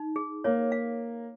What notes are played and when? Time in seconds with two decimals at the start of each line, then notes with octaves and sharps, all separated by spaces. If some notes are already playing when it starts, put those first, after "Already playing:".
Already playing: D#4
0.16 G#4
0.44 A#3 C#5
0.72 F5